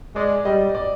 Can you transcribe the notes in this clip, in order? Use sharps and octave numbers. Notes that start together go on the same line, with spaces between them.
G#3 D5
G3 D#5
D5